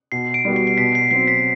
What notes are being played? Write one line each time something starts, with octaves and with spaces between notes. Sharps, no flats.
B2 C7
D7
G3 B3 F#4
C7
C7
B2 B6
C7
F#3 C4 C7
B6